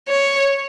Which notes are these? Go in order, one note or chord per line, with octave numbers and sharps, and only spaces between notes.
C#5